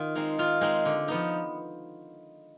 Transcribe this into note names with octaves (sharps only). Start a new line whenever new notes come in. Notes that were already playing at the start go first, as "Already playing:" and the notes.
Already playing: D#3 F4
G#3 C4 D#4
D#3 F4
G#3 C4 D#4
D3
F3 B3 D#4